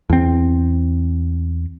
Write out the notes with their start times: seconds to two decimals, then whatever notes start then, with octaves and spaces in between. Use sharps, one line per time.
0.10 E2 C4